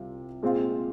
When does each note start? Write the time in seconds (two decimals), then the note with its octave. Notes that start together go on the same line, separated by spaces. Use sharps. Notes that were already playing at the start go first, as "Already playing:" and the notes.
Already playing: C2 C3 C4 F4
0.42 A#2 G#3 C4 F4